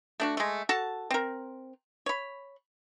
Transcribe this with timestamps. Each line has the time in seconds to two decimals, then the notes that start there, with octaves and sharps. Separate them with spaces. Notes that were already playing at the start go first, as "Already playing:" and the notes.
0.20 A3 D4 F#4
0.37 G#3 A3
0.69 F#4 A4 A5
1.11 C4 A#4
2.06 C#5 B5